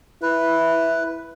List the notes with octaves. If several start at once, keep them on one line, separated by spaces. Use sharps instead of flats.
E4 B4